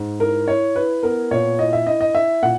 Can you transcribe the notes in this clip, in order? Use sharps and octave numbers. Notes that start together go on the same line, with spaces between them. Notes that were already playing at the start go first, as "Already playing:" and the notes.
Already playing: G#2
E4 A#4
E4 C#5
E4 B4
B3 A#4
A#2 C#5
E4 D#5
E5
E4 D#5
D#5
E4 E5
A#2 F#5